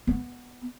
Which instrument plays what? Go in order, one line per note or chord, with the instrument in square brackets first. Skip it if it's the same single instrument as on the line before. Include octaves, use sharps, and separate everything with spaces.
[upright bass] B3